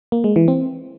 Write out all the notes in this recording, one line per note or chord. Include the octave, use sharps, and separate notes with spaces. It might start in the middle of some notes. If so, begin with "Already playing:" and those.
A#3
G#3
E3
C4